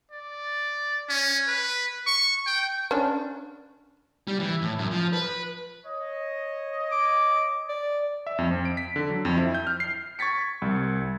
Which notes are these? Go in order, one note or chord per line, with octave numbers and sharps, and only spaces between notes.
D5
C#4
B4
C#6
G5
C#4 D4
G3
E3
A2
F#2
F3
B4
C#5 D#5
D6
D5
E5
F2
F2
D7
B6
D3
F#3
F2
E4
G6
F6
C7
C#6 G#6 A6 B6 C#7
C2